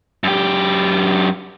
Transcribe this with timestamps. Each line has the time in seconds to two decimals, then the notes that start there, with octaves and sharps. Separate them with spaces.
0.24 F#2 G4